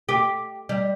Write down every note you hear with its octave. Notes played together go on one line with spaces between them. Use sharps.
G4
G3